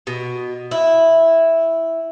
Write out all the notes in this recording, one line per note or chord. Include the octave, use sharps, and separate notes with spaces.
B2
E4